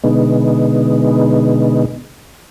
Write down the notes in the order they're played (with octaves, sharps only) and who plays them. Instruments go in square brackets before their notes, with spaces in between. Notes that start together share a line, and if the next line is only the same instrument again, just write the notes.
[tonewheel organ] B2 D3 G#3 B3 D#4